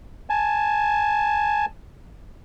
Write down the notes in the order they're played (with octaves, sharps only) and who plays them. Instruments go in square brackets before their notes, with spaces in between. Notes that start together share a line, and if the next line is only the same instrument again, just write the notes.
[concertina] G#5 A5